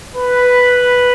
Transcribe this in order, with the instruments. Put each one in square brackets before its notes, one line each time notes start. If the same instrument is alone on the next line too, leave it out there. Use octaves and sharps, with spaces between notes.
[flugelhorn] B4